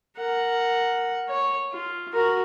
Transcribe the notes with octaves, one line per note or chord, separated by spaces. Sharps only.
A#4 F#5
C#5
F4
F#4 A#4